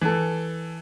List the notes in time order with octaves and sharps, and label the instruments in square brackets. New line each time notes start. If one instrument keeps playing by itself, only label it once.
[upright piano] E3 A4